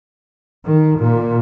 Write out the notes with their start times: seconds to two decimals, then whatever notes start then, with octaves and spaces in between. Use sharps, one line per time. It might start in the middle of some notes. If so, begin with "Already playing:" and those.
0.64 D#3
0.98 A#2